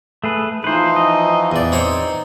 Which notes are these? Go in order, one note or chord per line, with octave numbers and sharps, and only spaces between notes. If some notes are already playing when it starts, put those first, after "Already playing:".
A3 G#4 B4
E3 F3 D#4 B4 C5
D#5
E2 D5
C4 D#4 C5 C#5